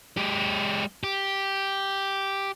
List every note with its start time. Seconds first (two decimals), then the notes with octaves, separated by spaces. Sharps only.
0.17 G#3 G4
1.03 G4